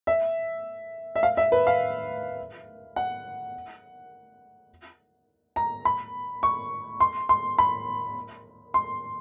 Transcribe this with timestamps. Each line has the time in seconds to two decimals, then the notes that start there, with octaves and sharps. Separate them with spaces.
0.07 E5
1.16 E5
1.23 F5
1.37 E5
1.52 B4
1.67 F5
2.96 F#5
5.56 A#5
5.85 B5
6.43 C#6
7.00 C6
7.29 C6
7.58 B5
8.74 C6